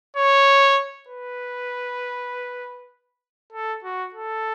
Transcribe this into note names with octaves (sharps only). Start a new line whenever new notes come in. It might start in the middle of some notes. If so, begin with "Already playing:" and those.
C#5
B4
A4
F#4
A4